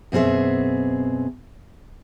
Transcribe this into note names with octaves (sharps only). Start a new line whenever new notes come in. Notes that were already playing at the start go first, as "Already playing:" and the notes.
F#2 B2 C4 G#4 E5